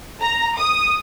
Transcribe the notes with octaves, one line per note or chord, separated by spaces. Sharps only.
A#5
D#6